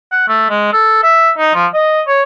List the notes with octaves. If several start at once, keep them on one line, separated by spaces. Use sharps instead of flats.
F#5
A3
G#3
A4
E5
D#4
F3
D#5
C#5